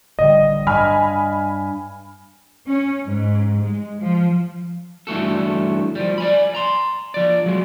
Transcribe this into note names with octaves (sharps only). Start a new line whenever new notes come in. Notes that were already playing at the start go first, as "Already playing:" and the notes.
A1 D3 G3 D#5
G2 G#5 B5 F6
C#4
G#2
G#3
F3
G2 E3 A3 F#4 A4
F3 G3
D5 G#5 B5
A#5 C6
F3 D5
F#3 G#3